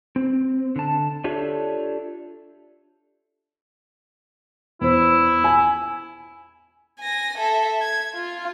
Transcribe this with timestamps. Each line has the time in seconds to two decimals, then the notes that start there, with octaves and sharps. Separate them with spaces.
0.16 C4
0.76 D3 A5
1.24 D4 F4 G4 A4 C#5 E5
4.81 E2 E4 C5
5.44 G#5
7.00 G#5 A#6
7.38 A4 E5
7.81 G#6
8.14 F4